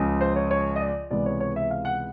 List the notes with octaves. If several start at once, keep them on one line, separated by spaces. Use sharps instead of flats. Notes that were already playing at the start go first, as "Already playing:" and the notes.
Already playing: C#2 C#3 F3
C5
C#5
C#5
D#5
D5
C#2 C3 E3 G#3 B3 D5
C#5
C#5
E5
F5
F#5